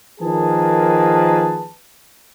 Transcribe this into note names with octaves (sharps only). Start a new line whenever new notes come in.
D#3 F3 A#3 G#4 B4 A5